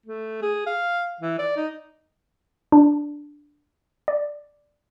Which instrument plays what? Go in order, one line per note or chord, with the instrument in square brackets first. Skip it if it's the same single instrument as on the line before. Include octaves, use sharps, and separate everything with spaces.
[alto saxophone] A3
G#4
F5
E3
D5
D#4
[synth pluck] D4
D5